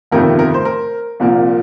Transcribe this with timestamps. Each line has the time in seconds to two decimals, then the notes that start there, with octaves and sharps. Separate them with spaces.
0.11 G1 F2 C3 D#3 A3 A#4
0.39 A#4
0.54 C5
0.65 A#4
1.20 C2 A#2 F3 A#3